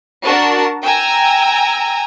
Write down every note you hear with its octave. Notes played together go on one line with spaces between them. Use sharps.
D4 F#4 A#4 A5
G5 G#5 A#5 E6